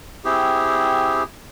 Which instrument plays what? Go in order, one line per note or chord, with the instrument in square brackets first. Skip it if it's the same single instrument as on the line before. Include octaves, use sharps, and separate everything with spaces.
[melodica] C4 E4 G4 G#4